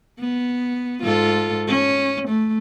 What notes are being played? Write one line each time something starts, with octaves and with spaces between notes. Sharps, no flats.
B3
G#2 F4 A4
C#4
A3